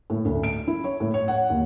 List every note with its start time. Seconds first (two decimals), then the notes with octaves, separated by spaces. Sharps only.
0.10 A2
0.25 D2
0.44 D7
0.68 E4
0.84 C#5
1.00 A2
1.14 C#5
1.28 F#5
1.50 D#2